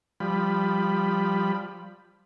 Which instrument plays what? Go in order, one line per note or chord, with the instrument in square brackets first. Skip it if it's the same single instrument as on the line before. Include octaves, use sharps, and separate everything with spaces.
[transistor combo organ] F3 G3 B5